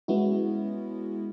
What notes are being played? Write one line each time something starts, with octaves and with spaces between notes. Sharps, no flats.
G#3 B3 C#4 E4 F#4